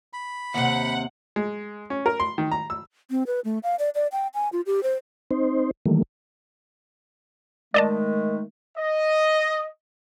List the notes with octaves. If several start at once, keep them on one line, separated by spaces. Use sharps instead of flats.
B5
D#2 C3 F#5
G#3
C#4
A#4
C6
D#3
A#5
E6
C4
B4
A3
F5
D5
D5
G5
G#5
F4
G4
C5
C4 D#4 C5
D#3 E3 G3 A3 A#3
D#3 G#3 A3 D5 D#5 A5
D#5